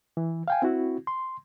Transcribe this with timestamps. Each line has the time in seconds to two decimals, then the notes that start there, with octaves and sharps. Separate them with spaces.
0.17 E3
0.48 F5 G5 G#5
0.62 C4 E4 F#4
1.07 C6